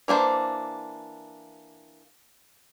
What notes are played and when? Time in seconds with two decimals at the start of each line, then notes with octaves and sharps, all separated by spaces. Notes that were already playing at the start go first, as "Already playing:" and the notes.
0.08 E3 A#3 D4 C5